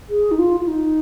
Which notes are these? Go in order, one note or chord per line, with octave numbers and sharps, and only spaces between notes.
G#4
D#4
F4
F4
D#4